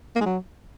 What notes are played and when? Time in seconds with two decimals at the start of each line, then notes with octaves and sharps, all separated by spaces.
0.16 A#3
0.21 G#3
0.26 F#3